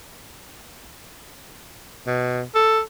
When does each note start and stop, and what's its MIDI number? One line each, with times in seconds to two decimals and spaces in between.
2.07 2.42 47
2.55 2.80 69